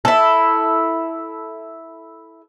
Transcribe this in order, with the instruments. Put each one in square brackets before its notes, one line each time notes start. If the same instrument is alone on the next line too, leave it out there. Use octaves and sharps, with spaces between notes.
[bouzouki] E4 A4